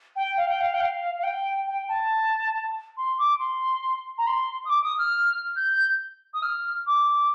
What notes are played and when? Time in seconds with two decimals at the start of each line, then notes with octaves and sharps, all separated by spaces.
0.16 G5
0.37 F5
0.49 G5
0.61 F5
0.74 G5
0.80 F5
1.19 F5
1.24 G5
1.67 G5
1.89 A5
2.97 C6
3.18 D6
3.40 C6
4.18 A#5
4.27 C6
4.65 D#6
4.70 D6
4.84 D#6
4.99 F6
5.56 G6
6.34 D#6
6.43 F6
6.86 D6